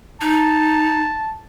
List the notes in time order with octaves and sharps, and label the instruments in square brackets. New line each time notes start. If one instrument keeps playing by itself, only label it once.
[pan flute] D#4 [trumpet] A5